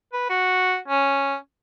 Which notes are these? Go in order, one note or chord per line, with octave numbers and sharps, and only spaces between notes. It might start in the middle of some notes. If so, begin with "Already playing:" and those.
B4
F#4
C#4